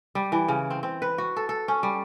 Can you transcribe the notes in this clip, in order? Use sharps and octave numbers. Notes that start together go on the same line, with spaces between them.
G3
E3
C#3
C4
C4
B4
F#4
A4
A4
C#4
G3